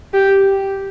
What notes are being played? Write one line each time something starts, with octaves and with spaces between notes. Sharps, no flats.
G4